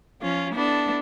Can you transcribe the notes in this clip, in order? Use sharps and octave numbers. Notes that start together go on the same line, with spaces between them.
F3 C#4 F4
B3 D4 E4 A4